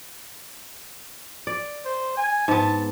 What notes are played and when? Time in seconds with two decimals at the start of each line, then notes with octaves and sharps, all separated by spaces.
1.47 D5
1.85 C5
2.17 G#5
2.48 G#2 B3 A5